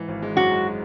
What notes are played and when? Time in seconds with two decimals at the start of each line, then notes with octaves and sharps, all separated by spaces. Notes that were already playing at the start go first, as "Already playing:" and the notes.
Already playing: G#2 E3
0.08 G#1
0.22 G#3
0.36 F#2 F#4
0.51 G#3